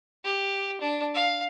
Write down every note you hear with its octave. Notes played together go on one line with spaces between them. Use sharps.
G4
D4
F5